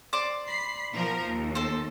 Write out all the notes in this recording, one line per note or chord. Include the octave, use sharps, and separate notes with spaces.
C5 D5 D6
B5 C7
B2 F3 A#4
D#2
A4 C5